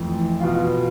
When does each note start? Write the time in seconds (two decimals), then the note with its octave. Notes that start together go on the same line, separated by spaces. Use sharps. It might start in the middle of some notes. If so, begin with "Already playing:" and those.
Already playing: F2 E3 A3
0.41 B2 B3 F4